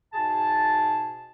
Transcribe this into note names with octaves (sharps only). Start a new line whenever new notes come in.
G#2 B2 G#4 A5